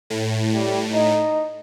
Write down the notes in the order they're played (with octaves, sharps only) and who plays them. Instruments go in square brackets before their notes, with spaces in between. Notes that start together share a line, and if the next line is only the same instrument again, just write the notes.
[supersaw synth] A2
[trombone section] G3
D#4